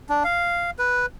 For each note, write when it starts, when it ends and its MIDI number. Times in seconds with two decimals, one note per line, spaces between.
0.09 0.23 62
0.24 0.71 77
0.79 1.06 71